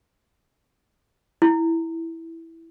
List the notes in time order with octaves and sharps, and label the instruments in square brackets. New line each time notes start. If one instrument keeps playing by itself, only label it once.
[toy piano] E4